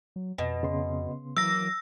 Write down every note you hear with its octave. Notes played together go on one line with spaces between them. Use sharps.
F#3
F2 B2
C#3 B3 C6
E3 F#3 A#3 E6 A#6